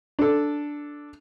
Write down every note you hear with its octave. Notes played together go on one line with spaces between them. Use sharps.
D4 A4